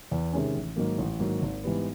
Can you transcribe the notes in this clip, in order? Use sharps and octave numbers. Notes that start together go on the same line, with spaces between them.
E2
C3 D#3 G#3 C#4
A1
G#2 D#3 F#3 A#3
A1
G#2 D#3 F#3 A#3
G#1
G#2 E3 G3 B3